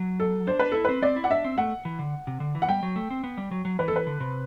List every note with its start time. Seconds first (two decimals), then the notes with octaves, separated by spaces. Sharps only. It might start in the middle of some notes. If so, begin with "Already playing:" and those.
Already playing: F#3
0.20 A4
0.47 D4 C5
0.59 D4 B4
0.72 E4 A4
0.85 C4 B4
1.02 C4 D5
1.16 E4
1.24 F#5
1.30 D4 E5
1.45 C4
1.58 A3 F#5
1.85 E3
1.99 D3
2.27 C3
2.40 D3
2.55 E3
2.62 F#5
2.68 G3 G5
2.83 F#3
2.96 A3
3.10 C4
3.24 B3
3.37 G3
3.51 F#3
3.65 F#3
3.79 E3 B4
3.88 A4
3.93 E3 B4
4.07 D3
4.20 C3